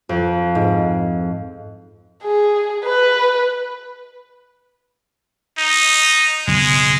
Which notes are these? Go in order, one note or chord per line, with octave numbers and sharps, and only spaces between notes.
F2
G#2
G#4
B4
D#4
F#1 B1 E2 G#3